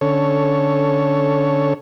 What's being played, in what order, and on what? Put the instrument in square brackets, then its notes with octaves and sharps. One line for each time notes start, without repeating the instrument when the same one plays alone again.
[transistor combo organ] D3 C#4 A4 C#5